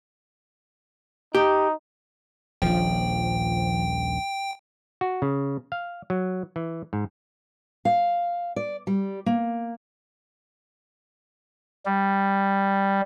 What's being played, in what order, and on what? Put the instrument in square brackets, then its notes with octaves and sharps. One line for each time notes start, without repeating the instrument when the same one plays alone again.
[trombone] D#4 [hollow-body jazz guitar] G4
[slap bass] D#1 A#1 [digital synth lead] F3 [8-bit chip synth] G5
[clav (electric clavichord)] F#4
C#3
F5
F#3
E3
G#2
[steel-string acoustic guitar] F5
D5
G3
A#3
[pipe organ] G3